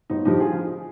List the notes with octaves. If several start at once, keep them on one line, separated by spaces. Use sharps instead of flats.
G1 D#4
G2 D3 F3 D#4 G4
F4 G#4